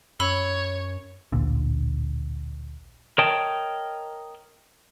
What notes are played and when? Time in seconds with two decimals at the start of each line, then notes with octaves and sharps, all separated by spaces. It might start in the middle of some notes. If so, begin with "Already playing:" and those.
0.20 F#2 C#5 B5 E6 G7
1.32 A1 D2 A#2 D3
3.18 A#4 C#5 D#5 G5 A5